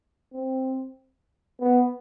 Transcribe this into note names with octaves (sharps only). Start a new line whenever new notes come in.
C4
B3